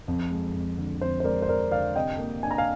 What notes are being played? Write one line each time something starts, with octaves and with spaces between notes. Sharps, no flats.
F2
G#3
F2
D3
F2 C5
C5
G#3 A#4 D5
C5
F2 A#4 D5
D3 D5 F5
C3 D#5 G5
A#3
D4 G#5
A#5
F5 G#5